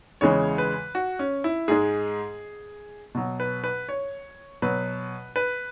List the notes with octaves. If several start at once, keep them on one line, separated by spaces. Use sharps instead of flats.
E2 C#3 E3 G#3 C#5
B4
F#4
C#4
E4
G#2 G#3 G#4
B2 F#3
B4
B4
C#5
B2 F#3 B4
B4